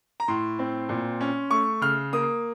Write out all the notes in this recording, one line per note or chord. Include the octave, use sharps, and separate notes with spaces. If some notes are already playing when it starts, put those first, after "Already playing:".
A#5
A2 C6
C4
A#2
C#4
A3 C#6
C#3 F6
A#3 D#6